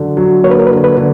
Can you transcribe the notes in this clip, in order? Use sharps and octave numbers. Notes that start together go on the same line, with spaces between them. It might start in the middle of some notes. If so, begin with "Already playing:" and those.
Already playing: D3 F#3
F#3
A#3 C#5
B4
A#4
B4
D3
B4
D3